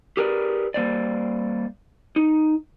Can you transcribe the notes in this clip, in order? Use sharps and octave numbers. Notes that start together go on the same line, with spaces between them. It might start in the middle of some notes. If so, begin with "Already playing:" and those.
G4 G#4 A#4 B4 D5
G3 A#3 C5 D5
D#4